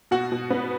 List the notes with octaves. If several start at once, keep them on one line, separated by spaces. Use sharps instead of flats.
B2 F#4 F#5
B2
B3